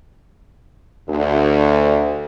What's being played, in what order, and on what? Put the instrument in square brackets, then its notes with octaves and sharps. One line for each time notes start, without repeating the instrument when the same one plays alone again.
[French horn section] D2